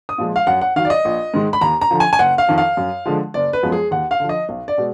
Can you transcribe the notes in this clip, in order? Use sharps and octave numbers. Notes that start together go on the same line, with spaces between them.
D#6
A#2 F3 G#3
F5
F#2 F#5
F#5
D#3 F#3 F5
D5
D#5
A#1
G#2 D#3 G#3
B5
D#2 A#5
A#5
D3 F3
G#5
G#5
F#1 F#5
F5
F2 D#3
F5
F#2
D3 F3 G#3
F#1 D5
B4
F#2 F3 G#3 B3
G#4
D#2 F#5
F5
D3 F3
D#5
B1
D5
B2 G#3